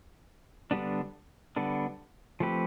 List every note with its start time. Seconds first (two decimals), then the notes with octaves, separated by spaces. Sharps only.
0.71 D3 G3 B3 D4
1.57 D3 G3 B3 D4
2.40 F3 A3 C4 G4 B4